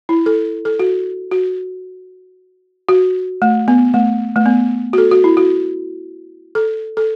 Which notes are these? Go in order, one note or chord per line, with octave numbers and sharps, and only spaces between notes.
E4
A4
A4
F#4
F#4
F#4
A3
B3
A3
A3
B3
F#4
A4
F#4
E4
F#4
A4
A4